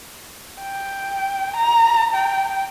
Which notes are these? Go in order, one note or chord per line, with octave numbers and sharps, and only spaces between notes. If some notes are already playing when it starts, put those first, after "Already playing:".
G5
A#5
G5